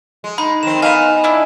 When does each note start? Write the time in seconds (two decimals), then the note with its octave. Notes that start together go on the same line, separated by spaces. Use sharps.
0.24 G#3
0.38 D#4 B5
0.63 D#3 C4 E7
0.82 B3 C4 D#4 F5 G#5
1.24 D4 E4